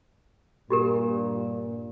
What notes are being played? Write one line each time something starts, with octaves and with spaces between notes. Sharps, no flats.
G2 A#2 F#4 G4 A#4